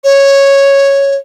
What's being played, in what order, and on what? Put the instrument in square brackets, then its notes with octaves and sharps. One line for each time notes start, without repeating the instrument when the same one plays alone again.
[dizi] C#5